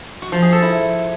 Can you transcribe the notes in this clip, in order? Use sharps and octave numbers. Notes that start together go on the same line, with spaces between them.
F#4
F3
G#4
A4
E4